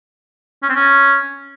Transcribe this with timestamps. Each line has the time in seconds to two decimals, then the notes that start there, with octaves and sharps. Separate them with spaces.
0.63 C#4
0.69 C4
0.76 C#4